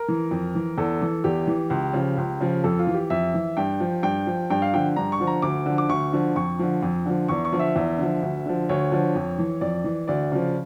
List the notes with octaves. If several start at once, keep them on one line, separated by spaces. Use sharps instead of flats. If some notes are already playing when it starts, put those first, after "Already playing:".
Already playing: A#4
E3
F2
E3
E2 A4
E3
E2 G4
E3
C#2
C#3 F3
C#2
C#3 F3
F2 A4
F4
E3
G4
F2 E5
E3
G2 G5
F3
G2 G5
F3
G2 G5
F5
D3 F3 G5
G2 A#5
C#6
D3 F3
A#5
D2 D6
D3 F3
D6
D2 C#6
D3 F3
F2 C#6
D3 F3
F2
D3 F3
E2 C#6
C#6
D3 F3
E5
E2
D3 F3
D2
D3 F3
D2 C#5
D3 F3
F2
E3
F2 D5
E3
D2 D5
C#3 F3